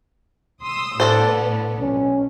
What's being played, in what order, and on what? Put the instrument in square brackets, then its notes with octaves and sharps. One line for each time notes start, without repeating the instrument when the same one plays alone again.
[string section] C6 D#6 E6
[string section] A2 B3 [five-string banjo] D4 A4 C5
[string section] B1 [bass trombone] C#4